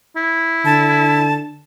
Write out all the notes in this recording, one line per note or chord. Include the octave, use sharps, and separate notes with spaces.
E4
D3 A5